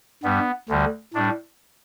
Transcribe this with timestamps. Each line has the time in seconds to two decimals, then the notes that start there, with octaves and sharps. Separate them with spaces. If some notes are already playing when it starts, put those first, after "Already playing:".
0.23 G2 G3 B3
0.69 D2 D3 G3
1.14 A2 G3 D4